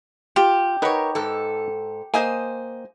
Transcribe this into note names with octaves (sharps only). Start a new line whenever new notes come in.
F4 G4
D#4 A#4 B4 C#5 F#5
G#2 A4
A#3 C5 D#5 G#5